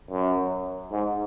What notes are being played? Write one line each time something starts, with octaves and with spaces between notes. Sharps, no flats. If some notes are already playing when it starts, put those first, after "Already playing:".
F#2
G#2